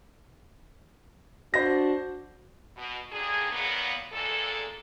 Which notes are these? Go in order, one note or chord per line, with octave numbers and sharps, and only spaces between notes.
D4 F#4 C5 A#6
B2
D#2 D3 D#3 D4 G#4
A#2 D#3 F#3 A#3 B3
E2 A#2 G#3 A4